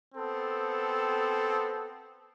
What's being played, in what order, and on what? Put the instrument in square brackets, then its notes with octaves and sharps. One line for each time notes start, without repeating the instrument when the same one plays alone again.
[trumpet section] B3 C4 A4